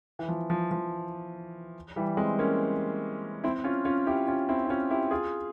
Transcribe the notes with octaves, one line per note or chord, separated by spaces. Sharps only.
E3
F3
F3
F3
E3 G3
G#3 C4
A#3 C#4
C4 E4
C#4 F4
C#4 F4
E4 G4
C#4 F4
C4 E4
E4
C#4 F4
E4 G4
F4 G#4